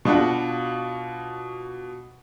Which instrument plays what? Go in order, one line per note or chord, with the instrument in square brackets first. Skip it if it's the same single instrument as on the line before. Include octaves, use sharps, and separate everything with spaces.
[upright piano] B2 D4 F4 F#4